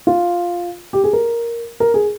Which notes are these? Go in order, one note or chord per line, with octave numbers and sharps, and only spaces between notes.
F4
G4
G#4
A#4
A#4
G#4